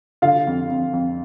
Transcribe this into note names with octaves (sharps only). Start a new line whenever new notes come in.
D3 F4 F5
F2
F2
F2